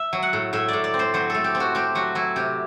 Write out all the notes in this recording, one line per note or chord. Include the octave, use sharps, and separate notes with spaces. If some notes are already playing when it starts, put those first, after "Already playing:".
Already playing: E5
F#3
F#5
A2
A2 E5
A2 D5
D5
C4
C5
F#3 C5
A3 A4
G4
C4
F#4
C4 G4
F#3 F#4
F#3 E4
C3 G4